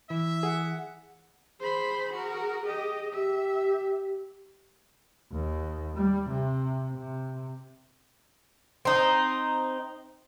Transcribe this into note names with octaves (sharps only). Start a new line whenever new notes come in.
E3 E5
G#4 F#5
G#4 C5 B5
F#4 A#4
G4 D#5
G4 E5
D#2
G3
C3
C3
C4 D#4